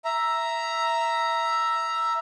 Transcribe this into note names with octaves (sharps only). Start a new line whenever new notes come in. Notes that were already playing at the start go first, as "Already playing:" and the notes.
E5 A#5